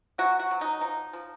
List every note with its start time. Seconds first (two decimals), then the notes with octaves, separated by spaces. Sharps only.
0.18 F#3 F#4
0.39 F#4
0.51 F#3
0.61 D#4
0.81 F3 D#4
1.13 F3